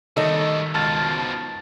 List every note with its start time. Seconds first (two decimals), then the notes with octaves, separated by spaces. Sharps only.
0.17 D#3 G3 A3 A4 D#5
0.75 C#2 B2 F3 A5 F6 A6